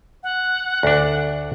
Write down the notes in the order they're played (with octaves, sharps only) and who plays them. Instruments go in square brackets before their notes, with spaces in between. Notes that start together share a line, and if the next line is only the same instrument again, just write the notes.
[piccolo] F#5
[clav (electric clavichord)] D2 D4